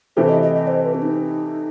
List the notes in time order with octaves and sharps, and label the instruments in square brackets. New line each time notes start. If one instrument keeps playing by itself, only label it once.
[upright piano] C3 E3 A3 E4 G4 [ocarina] C5
[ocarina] D#5
D#5
D#5
C5
B4
C4
D#4